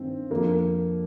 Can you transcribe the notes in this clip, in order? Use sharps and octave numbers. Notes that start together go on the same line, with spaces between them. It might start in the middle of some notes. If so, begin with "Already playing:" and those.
Already playing: G2 D#3 C4
F2 D3 F3 A#3